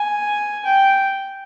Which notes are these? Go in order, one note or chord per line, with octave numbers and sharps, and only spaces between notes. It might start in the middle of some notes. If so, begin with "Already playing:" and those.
Already playing: G#5
G5